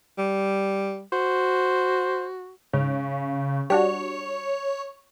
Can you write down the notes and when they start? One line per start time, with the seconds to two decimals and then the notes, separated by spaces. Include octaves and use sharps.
0.18 G3
1.12 F#4 C5
2.73 G#2 C#3
3.70 G3 D4 F#4 C#5